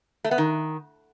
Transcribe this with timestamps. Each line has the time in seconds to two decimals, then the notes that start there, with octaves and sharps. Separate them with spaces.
0.24 A3
0.31 B3
0.38 D#3